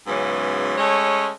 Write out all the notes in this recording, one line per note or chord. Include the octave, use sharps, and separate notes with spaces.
G#2 C#3 E3 F#3 B3 C#4
G#3 A3 C#4 C#5